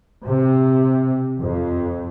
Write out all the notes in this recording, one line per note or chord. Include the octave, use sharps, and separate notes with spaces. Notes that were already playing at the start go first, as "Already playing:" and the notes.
C3
F2